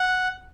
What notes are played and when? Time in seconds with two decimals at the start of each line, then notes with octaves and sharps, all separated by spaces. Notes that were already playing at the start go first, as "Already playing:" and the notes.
Already playing: F#5